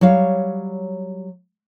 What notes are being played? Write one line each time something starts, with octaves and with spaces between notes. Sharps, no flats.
F#3 G3 C#5 F5